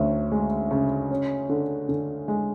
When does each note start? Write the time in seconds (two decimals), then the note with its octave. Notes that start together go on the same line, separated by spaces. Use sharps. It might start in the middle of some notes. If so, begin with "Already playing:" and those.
Already playing: D2 C#4
0.32 G#3
0.71 C#3
1.11 C#4
1.49 D3
1.89 D3
2.28 G#3